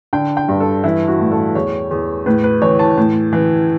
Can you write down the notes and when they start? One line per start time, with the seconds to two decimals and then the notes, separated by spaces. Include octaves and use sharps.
0.13 D3 G5
0.37 G5
0.49 G2
0.60 A4
0.84 E3 E4
1.08 F#4
1.20 A2
1.32 A4
1.55 E2 C#5
1.91 E2
2.26 A2 B4
2.44 B4
2.62 E3 C#5
2.79 A5
2.98 A2
3.33 E3